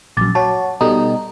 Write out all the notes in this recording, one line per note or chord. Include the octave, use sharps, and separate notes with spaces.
A#1 F#2 D6 A6
F#4 C#5 F#5 A5
B2 G3 D#4 A4